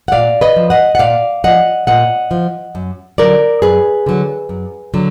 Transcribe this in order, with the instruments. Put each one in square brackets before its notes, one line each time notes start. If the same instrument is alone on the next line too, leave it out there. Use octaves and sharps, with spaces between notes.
[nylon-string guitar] F#5
A#2 D5 F5
B4 D#5
F3
D#5 F#5
F#5
A#2 D5 F5
F3 D#5 F#5
A#2 D#5 F#5
F3
F#2
D3 F#3 A#4 D5
F#2 G#4 B4
D3 F#3
F#2
D3 F#3